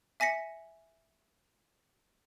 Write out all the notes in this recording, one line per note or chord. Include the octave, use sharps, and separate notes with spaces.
E5 G#5 A#6 B6 C#7